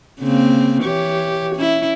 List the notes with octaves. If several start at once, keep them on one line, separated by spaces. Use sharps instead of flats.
C#3 A#3 C4
E3 G4 C#5
C#4 E4